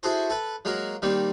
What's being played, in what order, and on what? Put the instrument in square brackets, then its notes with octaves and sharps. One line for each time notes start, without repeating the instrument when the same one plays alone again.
[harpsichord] E4 F#4 G#4 A4 C5
A4 B4
F#3 G#3 A#3 F#4 A#4
D#3 G3 A#3 C4